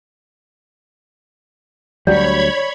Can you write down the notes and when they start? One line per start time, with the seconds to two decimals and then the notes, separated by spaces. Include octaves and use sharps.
2.07 D2 F#3 G3 C#5 D5 B5 G#6